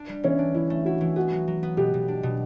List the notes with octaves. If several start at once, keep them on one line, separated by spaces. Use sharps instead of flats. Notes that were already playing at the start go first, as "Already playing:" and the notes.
Already playing: D4
G3
E3 C#4
D4
E3 E4
A3
E4 F#4
E3
B3 F#4
F#3
F#3
B3
B2 G4
B2
D4
B2